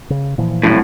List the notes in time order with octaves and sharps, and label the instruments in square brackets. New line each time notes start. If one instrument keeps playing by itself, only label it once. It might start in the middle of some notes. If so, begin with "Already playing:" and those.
[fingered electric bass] C#3
A#2 E3 F3
[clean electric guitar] C2 F#2 A2